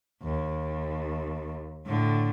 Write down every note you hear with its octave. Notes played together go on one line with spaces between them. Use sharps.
D#2
A2 D3